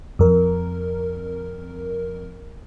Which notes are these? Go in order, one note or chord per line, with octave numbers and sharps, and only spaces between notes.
F2 A#4